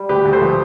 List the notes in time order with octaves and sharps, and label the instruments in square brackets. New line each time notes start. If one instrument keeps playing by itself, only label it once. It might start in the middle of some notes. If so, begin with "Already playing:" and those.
Already playing: [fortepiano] G3
D2 G4 B4
D2
A4 C5
F3